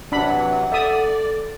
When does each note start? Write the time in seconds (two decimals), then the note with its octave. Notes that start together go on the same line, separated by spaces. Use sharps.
0.12 C3 E3 F#3 D4 F#5 B5
0.72 A4 D5 E5 D#6